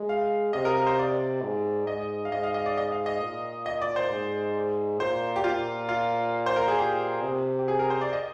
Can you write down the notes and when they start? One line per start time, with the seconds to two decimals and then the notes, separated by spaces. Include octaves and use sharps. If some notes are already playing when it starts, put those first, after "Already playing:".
Already playing: G#3
0.09 F5
0.53 C3 D#5
0.65 A#4
0.77 A#4
0.87 C5
0.99 D5
1.43 G#2
1.87 G#2 D#5
2.25 F5
2.32 G#2 D#5
2.43 F5
2.54 D#5
2.66 D5
2.77 D#5
2.92 F5
3.06 D#5
3.22 A#2
3.66 D#5
3.82 D5
3.96 C5
4.11 G#2
5.00 A#2 C5
5.36 G4
5.44 A#2 F4
5.89 F4
6.46 C5
6.56 A#4
6.68 G#4
6.78 G4
7.23 C3
7.59 G4
7.68 G#4
7.79 A#4
7.90 C5
8.01 D5
8.13 D#5